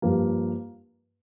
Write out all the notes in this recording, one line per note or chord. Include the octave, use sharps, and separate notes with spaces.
G2 F3 A#3